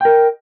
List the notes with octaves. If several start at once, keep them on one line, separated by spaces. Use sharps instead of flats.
A#4 D#5 G5